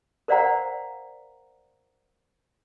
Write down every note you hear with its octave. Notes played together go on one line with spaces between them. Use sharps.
A#4 C5 D5 F5 F#5 A#5